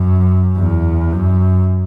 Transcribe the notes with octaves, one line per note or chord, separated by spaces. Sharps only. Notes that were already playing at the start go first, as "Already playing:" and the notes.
Already playing: F#2
E2
F#2